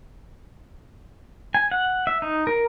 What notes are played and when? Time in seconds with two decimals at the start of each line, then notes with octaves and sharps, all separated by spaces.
1.55 G#5
1.72 F#5
2.07 E5
2.22 D#4
2.47 A#4